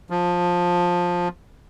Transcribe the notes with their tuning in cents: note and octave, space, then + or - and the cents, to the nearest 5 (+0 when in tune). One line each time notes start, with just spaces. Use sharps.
F3 +15